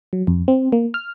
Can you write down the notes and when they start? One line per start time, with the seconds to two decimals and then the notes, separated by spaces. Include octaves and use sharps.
0.13 F#3
0.27 F2
0.48 C4
0.72 A#3
0.94 F6